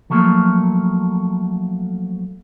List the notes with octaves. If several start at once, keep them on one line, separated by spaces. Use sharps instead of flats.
F3 F#3 A3 A#3